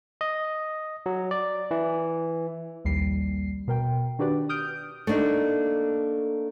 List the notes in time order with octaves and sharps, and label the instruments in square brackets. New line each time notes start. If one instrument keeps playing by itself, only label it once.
[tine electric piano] D#5
F#3
D5
E3
[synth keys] A#1 D#2 G3 C7
B2 A#4 G5
D#3 D4 F#4 G4 B4 D5
D#6 F6 G6 D7
[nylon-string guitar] A3 A#3 D4 D#4